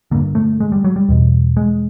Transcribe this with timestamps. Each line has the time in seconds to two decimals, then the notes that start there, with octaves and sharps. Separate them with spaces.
0.11 G2 D3 A#3
0.35 A3
0.60 G#3
0.72 G3
0.84 F#3
0.96 G3
1.09 E2 B2
1.57 G#3